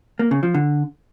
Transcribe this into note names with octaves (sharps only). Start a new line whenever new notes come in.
A#3
C#3
F3
D3